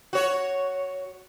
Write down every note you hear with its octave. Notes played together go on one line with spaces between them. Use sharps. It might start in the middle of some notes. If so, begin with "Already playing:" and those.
F#4 C#5